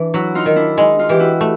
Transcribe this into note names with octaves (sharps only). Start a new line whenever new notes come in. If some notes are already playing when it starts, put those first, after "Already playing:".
Already playing: E3 D4
F#3 E4 F#4
D#4 F4
D#3
D4 E4
G#3 D#4
D#4 F4
E3 G4
E4 F#4
A3